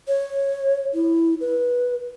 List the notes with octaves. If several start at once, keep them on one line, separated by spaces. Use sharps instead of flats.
C#5
E4
B4